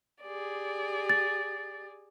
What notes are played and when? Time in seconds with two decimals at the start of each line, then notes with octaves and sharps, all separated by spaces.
0.23 G4 G#4 D5
1.09 A6